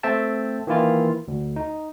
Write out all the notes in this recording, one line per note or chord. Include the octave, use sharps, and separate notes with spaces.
A3 C4 E5 G5 A5
D#3 E3 A#3 E4 F4
D2
D#4